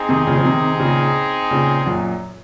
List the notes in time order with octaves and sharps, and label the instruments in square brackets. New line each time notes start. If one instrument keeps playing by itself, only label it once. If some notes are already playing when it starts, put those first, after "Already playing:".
Already playing: [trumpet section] C4 D#4 G#4
[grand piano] C3 D#3
A#2 C#3
F3
C3 D#3
A#2 C#3
A#2 C#3
F#2 A#2